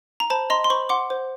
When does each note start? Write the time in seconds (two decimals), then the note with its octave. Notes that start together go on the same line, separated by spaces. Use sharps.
0.20 A#5
0.30 C5 A5 B5
0.50 D#5 A#5 C6
0.64 C6
0.70 C5 B5 C#6
0.89 F#5 C6 D6
1.10 C5